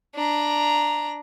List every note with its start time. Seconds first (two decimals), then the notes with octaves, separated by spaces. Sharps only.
0.15 D4 A#5